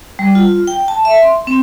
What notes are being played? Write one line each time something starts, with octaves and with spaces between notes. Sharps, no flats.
G3
F4
G5
A5
E5
C6
C4